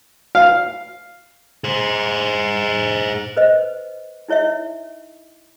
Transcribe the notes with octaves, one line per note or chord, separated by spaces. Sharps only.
F5
G#4 C5
B4 C5 D#5
D#4 E4 C#5 D#5 E5